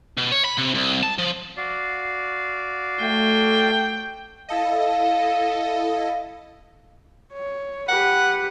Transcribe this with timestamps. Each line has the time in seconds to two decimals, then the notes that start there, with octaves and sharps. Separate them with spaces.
0.18 B2
0.32 C#5
0.45 B5
0.58 C3
0.75 C2
1.03 A5
1.18 F3
1.57 F#4 D5 F5
3.01 A3 G5
4.49 E4 A4 D#5 F5
7.33 C#5
7.88 G4 B4 F#5